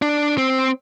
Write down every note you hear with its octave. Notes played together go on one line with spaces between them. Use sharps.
D4
C4